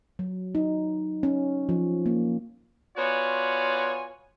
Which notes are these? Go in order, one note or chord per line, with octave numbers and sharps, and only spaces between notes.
F#3
D#4
C#4
F3
A#3
B3 F4 F#4 C#5 D5 G#5